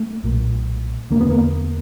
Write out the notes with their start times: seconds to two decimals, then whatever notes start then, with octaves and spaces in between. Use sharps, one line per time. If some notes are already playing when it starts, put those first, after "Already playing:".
Already playing: A3
0.24 B1 A#2
1.10 E1 D2 D3 A#3
1.21 B3
1.30 A#3